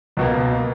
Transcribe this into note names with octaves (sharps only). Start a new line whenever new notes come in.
C#2 B2 A#3